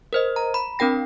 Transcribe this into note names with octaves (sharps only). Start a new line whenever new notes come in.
A#4 C5 D#5
A#5
B5
C4 D4 A#4 G5 A#6